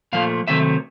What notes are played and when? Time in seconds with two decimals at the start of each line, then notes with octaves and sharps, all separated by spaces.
0.13 A#2 F3 A3 F5
0.48 C3 D#3 F#3 A3 E5